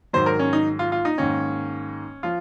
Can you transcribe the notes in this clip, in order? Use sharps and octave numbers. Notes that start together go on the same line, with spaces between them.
G#2 D#3 F#3 C5
A#4
C#4
D#4
F4
F4
D#4
G#2 D#3 A#3 C#4
F3 F4